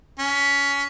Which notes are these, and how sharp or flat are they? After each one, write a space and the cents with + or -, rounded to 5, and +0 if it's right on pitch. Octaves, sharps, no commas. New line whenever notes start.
C#4 +20